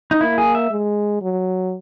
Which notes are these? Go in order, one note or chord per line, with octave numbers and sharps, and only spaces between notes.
D#4
A#3 E4
G#4
E5
G#3
F#3